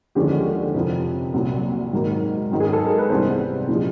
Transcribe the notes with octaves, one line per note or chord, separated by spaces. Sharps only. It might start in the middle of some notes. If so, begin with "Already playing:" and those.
D#2 D3 F3 G#3 C#4 G4
F2 C3 F3
C2 A#2 F#3
G#2 D#3 F#3 A#3
G#2 D#3 F#3
G#4
A4
A#4
B4
C2 C3 E3 G3 B3 C5
A#2 F3 G#3